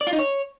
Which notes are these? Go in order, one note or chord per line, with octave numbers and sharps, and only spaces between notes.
D5
F4
D#4
C#5